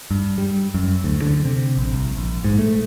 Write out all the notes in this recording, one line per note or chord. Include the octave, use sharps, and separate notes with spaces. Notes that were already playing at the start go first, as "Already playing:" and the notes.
G2
G3
F#2
D2
D3
C3
A#1
C2
A#1
G#2
A3